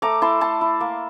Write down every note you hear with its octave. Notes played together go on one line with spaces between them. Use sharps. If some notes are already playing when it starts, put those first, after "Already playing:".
A3 A#5 D6
E4 A5 C6
A3 A5 C6
E4
A#3